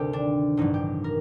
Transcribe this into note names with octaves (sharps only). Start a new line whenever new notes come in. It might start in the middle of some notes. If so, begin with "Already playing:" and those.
Already playing: D2 G2 C3 D#3 G4 A4
D4
A1 G2 F#3 D#4
G4
A#4